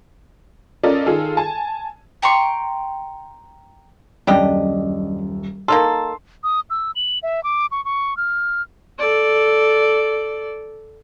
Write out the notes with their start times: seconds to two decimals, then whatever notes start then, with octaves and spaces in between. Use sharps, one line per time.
0.83 C#4 F4 A4 A#4 D5 D#5
1.06 D#3 F4 G#4 A4
1.37 G#5 A5
2.22 G5 A#5 C6 C#6
4.27 D#1 F#2 D4 G4 D#5
5.68 A#3 D#4 A4 C6
6.44 D#6
6.70 E6
6.96 F#7
7.23 E5
7.44 D6
7.72 C#6
7.85 C#6
8.17 F6
8.99 A4 D5